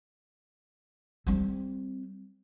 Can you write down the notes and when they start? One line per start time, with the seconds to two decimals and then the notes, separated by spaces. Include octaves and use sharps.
1.27 G3 C4